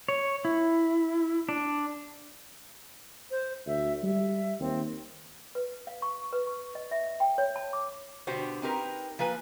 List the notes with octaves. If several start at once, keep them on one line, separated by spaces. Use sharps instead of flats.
C#5
E4
D4
C5
D2 E5
G3 E5
D#2 C4
B4
F5
C#6
B4
C#6
D#5
E5
G5
C#5
A5
D6
B2 D3 D4 F#4 G4 C5
C4 D#4 G4 A#4 B4
F3 A#3 B4 G#5